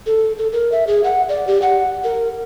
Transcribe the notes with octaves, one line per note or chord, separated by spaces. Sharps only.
A4
A4
A#4
E5
G#4
F#5
D5
G4
F#5
A#4